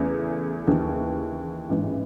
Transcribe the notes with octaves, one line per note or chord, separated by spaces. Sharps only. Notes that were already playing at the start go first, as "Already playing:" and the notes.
Already playing: E2 C#3 E3 A3
D#2 C#3 E3
A1 G#2 E3